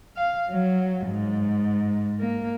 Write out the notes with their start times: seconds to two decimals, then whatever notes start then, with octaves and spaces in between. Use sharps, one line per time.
0.17 F5
0.50 F#3
1.08 G#2
2.20 A#3